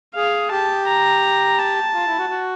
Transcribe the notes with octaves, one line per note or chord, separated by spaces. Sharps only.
G#4 F5
G4 A5
A#5
A5
F4
E4
F#4
F#4